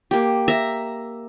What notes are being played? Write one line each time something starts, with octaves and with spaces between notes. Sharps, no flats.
A#3 G4
E5 A#5